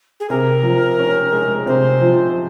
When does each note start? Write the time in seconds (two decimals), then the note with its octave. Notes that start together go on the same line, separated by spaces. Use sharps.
0.20 G#4
0.30 C3 A#4
0.63 F3
0.99 C#4
1.32 G#3
1.66 C3 C5
2.01 F3